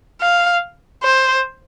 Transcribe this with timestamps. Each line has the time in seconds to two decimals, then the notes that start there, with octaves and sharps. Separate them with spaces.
0.21 F5
1.03 C5